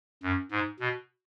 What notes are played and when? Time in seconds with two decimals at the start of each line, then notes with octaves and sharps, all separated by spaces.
0.23 F#2
0.51 G#2
0.80 B2